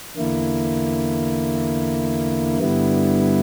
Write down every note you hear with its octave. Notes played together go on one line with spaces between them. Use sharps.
E2 D3 A#3 E4
G2 D3 G3 B3 E4